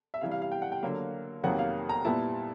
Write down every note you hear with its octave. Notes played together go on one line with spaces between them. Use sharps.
E5
C3 E3 G3 F5
F5
F5
G5
F#5
G5
D3 F#3 A#3 F5
F2 C3 D#3 F#3 A#3 F#5
F5
A#5
A#2 G3 B3 E4 A5